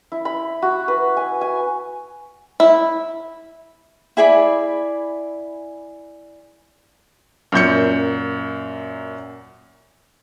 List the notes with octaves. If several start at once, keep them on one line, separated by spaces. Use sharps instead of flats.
E4
B5
F#4
B4
G#5
G#5
E4
E4 G#4 D5 B5
F#2 A#2 G6 C#7